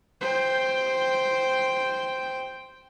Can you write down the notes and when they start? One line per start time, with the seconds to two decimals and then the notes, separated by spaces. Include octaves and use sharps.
0.21 C5 G5